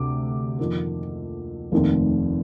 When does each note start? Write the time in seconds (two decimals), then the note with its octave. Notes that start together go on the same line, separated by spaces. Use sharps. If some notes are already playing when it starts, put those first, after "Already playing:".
Already playing: D2 C3 A3 D6
0.59 F2 D#3 A#3
1.72 F1 D#2 D#3 A3 C4